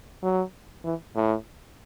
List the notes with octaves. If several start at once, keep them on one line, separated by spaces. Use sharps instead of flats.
F#3
E3
A2